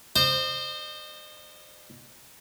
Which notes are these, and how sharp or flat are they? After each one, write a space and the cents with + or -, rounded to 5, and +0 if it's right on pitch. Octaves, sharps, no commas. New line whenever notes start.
C5 +0 D#5 -40